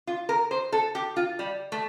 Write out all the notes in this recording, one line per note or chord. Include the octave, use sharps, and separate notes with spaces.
F4
A#4
C5
A4
G4
F4
G3
A3